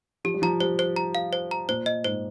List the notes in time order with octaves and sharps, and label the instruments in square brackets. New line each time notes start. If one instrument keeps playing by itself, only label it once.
[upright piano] F3 [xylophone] G4
[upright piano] G3
[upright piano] F3 [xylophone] A#5
[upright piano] G3 [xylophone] C5
[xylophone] C5
A#5
F5
C5
A#5
[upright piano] A#2 [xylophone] C5
[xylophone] D#5
[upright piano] G#2 [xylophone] C5